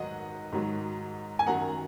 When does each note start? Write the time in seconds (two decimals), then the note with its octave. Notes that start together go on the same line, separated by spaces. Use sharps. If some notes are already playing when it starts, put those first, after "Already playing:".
Already playing: G#2 D#3 F#3 D#5 F#5
0.52 G#2 D#3 F#3
1.39 G#5
1.46 F#2 D#3 F#3 F#5 A#5